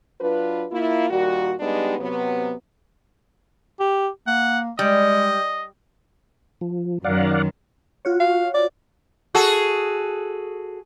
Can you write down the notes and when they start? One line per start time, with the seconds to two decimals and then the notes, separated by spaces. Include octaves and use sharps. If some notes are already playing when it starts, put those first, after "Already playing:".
0.21 F#3 D4 F4 B4
0.71 A#3 E4 F4
1.10 A#2 D#3 G3 F#4
1.60 G3 G#3 B3 D4 D#4 G4
1.98 C3 F#3 B3
3.80 G4
4.27 A#3 F#5
4.79 G3 G#3 D#5
6.61 F3
7.04 F#2 D#3 D5 F5 F#5
8.05 F4 F#4 C#5
8.20 F5
8.55 D5
9.35 F#4 G#4 A4